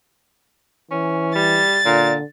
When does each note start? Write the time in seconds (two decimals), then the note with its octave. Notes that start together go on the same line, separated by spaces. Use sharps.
0.91 E3 C#4
1.35 G3 A6
1.85 A#2 D3